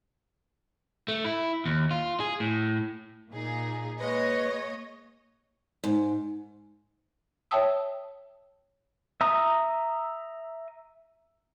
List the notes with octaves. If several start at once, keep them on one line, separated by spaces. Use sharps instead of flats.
A3
E4
D#2
F4
G#4
A2
A#2 D#4 G#4
G#3 A#3 B4 C#5 D#5
G#2
C#5 E5 G5 A5 D#6 E6
E5 A#5 D#6